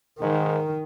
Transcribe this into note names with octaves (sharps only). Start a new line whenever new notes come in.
G#2 D#3